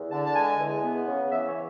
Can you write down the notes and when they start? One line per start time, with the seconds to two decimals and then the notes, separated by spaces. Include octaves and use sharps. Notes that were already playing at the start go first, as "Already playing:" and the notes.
Already playing: E2
0.11 D3 A5
0.24 A5
0.36 G#3 G#5
0.59 E2
0.83 B3
1.07 C#3
1.31 E3 E5
1.48 C#5